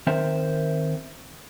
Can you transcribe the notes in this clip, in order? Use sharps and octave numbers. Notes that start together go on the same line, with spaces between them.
D#3 C4 A#4 C5 E5 G5